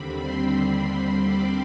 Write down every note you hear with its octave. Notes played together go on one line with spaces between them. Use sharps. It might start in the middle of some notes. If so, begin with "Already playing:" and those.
Already playing: D#2 D3 G3 C4 B5
C6
D6